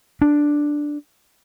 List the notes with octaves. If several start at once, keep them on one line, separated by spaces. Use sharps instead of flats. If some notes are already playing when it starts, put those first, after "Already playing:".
D4